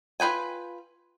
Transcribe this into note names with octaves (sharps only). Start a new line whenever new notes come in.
F4 B4 G5 G#5